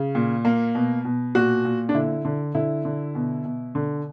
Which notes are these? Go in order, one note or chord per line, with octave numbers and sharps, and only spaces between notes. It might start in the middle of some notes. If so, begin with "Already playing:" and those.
Already playing: C#3
A#2
A#3
B2
B2
A#2 F#4
A#2
D4
D3 E4
D3
D3 E4
D3
B2
B2
D3